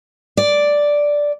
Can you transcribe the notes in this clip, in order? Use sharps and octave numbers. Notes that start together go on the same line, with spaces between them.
D5